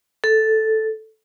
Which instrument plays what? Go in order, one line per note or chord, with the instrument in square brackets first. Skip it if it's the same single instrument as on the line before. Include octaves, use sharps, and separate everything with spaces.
[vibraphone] A4